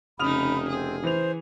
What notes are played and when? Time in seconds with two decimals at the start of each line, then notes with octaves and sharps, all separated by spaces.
0.19 F1 C#3 C#4 D#4 B5 D#6 F6 F7
0.70 C4 G#4
1.03 E3 C5 F7